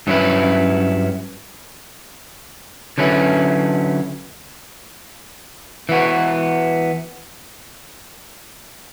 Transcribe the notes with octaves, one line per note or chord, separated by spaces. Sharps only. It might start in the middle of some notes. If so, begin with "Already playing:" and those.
G2 F#3 C#4 E4 B4
D3 F#3 C#4 E4 B4
E3 B3 F#4